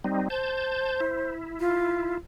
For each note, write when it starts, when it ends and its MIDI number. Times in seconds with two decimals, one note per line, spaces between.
0.04 0.28 55
0.04 0.28 60
0.04 0.28 63
0.30 1.31 72
0.30 1.00 81
0.30 1.00 91
1.00 2.17 64
1.60 2.16 65